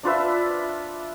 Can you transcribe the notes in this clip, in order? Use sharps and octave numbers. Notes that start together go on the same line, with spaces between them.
D4 F4 B4 E5